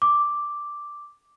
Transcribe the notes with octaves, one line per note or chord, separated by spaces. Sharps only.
D6